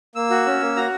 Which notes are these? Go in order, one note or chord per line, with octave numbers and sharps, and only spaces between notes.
A#3 E6
F#4
C#4
A#3
F#4 A#5